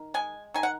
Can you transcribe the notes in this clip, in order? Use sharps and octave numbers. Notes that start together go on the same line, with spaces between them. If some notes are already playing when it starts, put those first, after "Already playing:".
Already playing: D#3
G#3 G#5
D#3 G#5
F#5